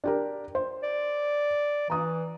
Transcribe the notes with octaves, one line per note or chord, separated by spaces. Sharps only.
D4 G4 A#4
C5
D5
E3 A#5 D#6